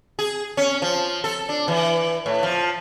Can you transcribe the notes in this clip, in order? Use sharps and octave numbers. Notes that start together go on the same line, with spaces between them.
G#4
C#4
F3
A4
D4
E3
A2
F3